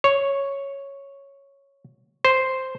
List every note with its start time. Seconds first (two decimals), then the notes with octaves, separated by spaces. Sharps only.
0.04 C#5
2.25 C5